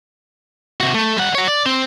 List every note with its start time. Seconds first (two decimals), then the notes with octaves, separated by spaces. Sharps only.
0.80 C3 F#4
0.94 A3
1.17 G3 F#5
1.35 F#4 C#5
1.48 D5
1.66 C4